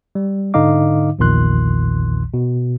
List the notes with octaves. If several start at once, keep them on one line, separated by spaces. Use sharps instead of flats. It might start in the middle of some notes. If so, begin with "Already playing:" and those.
G3
G#2 D3 D#4 D#5 F5 D6
A#1 E2 A#2 D#3 C6 F#6
B2